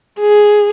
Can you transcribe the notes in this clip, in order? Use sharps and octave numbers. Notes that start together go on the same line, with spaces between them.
G#4